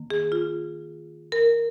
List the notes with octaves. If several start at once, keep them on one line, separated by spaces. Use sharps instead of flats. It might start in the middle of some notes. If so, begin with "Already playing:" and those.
Already playing: D#3 A#3
G#4
F4
A#4